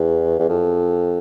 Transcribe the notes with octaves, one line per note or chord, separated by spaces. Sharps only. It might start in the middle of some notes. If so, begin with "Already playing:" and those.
Already playing: E2
E2
F2